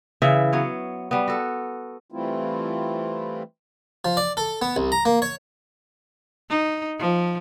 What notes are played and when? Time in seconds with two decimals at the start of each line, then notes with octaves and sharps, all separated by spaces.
0.22 C#3 E3 E5
0.53 F#3 B3 C#5
1.11 G3 B3
1.28 F#4 A4
2.12 E3 G3 A3 C4 E4 F4
4.05 F3
4.17 D5
4.37 A4
4.62 B3
4.76 C2
4.92 A#5
5.05 A#3
5.22 C#5
6.50 D#4
6.99 F3